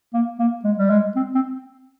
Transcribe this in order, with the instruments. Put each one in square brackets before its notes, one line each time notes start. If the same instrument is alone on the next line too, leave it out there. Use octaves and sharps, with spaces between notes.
[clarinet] A#3
A#3
G#3
G3
G#3
C4
C4